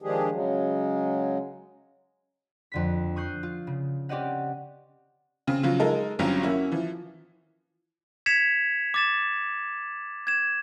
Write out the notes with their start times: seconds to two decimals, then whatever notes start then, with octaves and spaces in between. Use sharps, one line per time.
0.02 D#3 F3 G#3 D4 G4 G#4
0.32 C#3 F#3 G#3
2.72 F2 D3 B6
3.16 C#6 D#6 F#6 G6 C7
3.43 F4
3.67 C#3
4.09 C4 C#4 G4 D5 D#5 F#5
5.47 C#3 C4
5.63 C#3 F3 F#3 F4
5.79 G#3 D#4 A4 A#4
6.19 G1 G2 F#3 C4 C#4 A#5
6.43 A#3 C#4 E4 F#4
6.72 E3 F3
8.26 G#6 B6 C#7 E7 F7
8.94 D6 A6 E7
10.27 G#6 E7